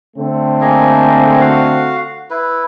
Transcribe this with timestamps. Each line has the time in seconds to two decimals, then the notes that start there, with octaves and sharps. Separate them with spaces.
0.17 D3 A3 C4
0.61 A#3 G#4 D#5
1.41 F#4 F5
2.31 E4 B4